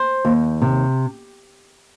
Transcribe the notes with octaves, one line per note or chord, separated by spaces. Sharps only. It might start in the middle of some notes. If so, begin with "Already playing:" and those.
Already playing: C5
D#2
C3